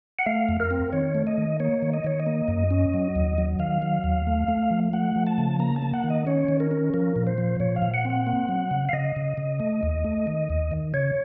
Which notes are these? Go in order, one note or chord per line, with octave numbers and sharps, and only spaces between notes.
F#5
A3 F5
F2
A#4
C4
D#3 C#5
A3
D#5
D#3
A#3 C#5
D#3
D#5
D#3 C#5
D#5
A#3
F#2
C#4
F#3
D#2
F#3
D#3 F5
F#3
D#2
A3
A3
F3
A3 F#5
F3
A5
C#3
A#3 A#5
A5
A#3
F#5
D#3
D#5
C#4 C#5
D#3
A#4
C#4
F3 A#4
A#2
C5
F3
A#2 C#5
F5
A#2
F#5
C4
F#5
A#3
F#3
C#3
F5
C#3 D#5
C#3
C#3
A3
D#2
A3
D#3
D#2
D#3
C#3 C#5